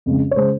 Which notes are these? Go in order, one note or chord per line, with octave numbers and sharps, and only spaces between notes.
F2 C#3 G#3
C#5
C#3 G#3 C5